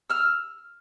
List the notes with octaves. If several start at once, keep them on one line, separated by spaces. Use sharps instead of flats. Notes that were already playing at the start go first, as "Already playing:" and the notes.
E6 F6